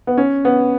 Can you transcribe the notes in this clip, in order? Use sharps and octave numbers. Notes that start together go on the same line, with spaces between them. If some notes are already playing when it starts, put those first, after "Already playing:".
B3
C#4
B3